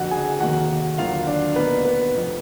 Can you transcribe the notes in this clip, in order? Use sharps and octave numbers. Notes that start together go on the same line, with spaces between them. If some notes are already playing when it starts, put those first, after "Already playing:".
Already playing: F#1 F2 D3 F#4 F#5
G#4 G#5
F1 D#2 D#3 A#3 F#4 F#5
D#2 D3 F#3 A#3 F4 F5
D4 D5
B1 B2 A#3 B3 B4
B3 B4
F1 F2 F3 B3